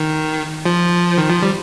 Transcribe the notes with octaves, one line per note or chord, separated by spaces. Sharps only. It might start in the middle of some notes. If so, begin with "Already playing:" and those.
Already playing: D#3
F3
D#3
F3
G3